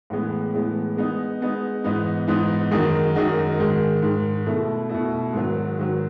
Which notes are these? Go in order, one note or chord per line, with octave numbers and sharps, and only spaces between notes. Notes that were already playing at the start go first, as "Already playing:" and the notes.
A2 E3 G#3 B3
A2 E3 G#3 B3
G#3 B3 D#4
G#3 B3 D#4
G#2 E3 B3 D#4
G#2 E3 B3 D#4
F#2 D#3 G#3 D#4 F#4
F#2 D#3 G#3 D#4 F#4
G#2 D#3 G#3
G#2 D#3 G#3
B2 A3 E4
B2 A3 E4
G#2 D#3 F#3
G#2 D#3 F#3